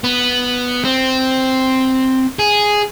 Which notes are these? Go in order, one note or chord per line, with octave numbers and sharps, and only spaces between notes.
B3
C4
G#4